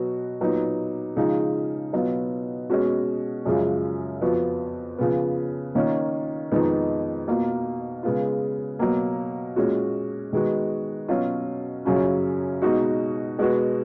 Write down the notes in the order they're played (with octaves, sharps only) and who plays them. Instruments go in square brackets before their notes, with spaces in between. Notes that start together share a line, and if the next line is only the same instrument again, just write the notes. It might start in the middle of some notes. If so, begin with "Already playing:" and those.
Already playing: [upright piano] B2 F#3 B3 F#4
A#2 F#3 B3 D#4
C#3 F3 G#3 D#4
B2 F#3 B3 F4
B2 G#3 C#4 F#4
F#2 C#3 F3 G#3
F2 F3 B3 F#4
C#3 F3 B3
D#3 A#3 C#4 F4
F2 D#3 G#3 B3 D#4
B2 A#3 F4
C#3 G#3 B3 F4
B2 F#3 A#3
A#2 G#3 C#4 F#4
D#3 G#3 B3 F#4
B2 F#3 C#4 F4
F#2 C#3 F#3 C#4 F4
B2 G#3 D#4 F#4
B2 G#3 B3 F#4